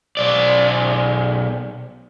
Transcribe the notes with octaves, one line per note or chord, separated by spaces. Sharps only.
B1 D5